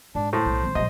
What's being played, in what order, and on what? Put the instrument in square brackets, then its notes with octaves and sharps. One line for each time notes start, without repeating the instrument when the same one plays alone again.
[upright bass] G#2 [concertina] D4
[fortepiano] A2 [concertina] C5
[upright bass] B1
D#3 C4
[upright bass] A#1 F#3 [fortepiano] D#5